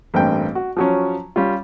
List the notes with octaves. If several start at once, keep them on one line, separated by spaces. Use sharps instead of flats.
A1 G2 A#3 C4 G5
F#4
F3 F#3 C#4
G3 C#4 F4